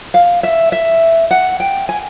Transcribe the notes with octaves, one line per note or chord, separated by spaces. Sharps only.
F5
E5
E5
F#5
G5
G#5